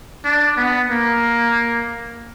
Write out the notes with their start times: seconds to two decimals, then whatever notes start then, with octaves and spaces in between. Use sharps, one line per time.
0.25 D4
0.57 B3
0.90 A#3